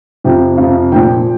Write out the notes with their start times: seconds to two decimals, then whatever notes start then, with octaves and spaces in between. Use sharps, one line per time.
0.24 F2 C3 F3 G5
0.58 F2 C3 F3 F5
0.92 A#2 F3 G5